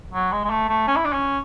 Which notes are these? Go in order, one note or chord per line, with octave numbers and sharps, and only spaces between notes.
F#3
G#3
G#3
A3
A3
C#4
E4
D4
C#4